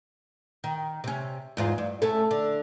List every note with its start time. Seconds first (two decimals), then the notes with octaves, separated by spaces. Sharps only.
0.64 D#3
1.04 C3 C#4
1.57 E2 G#2 F4
1.78 G2
2.02 A3 C#4 A4
2.31 D3